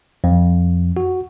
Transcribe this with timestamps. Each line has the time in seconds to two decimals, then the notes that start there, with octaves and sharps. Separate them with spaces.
0.24 F2
0.97 F#4